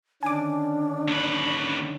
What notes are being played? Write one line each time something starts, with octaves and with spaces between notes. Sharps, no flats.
D3 D#3 C#4 D4 G#5 D6
D#2 B4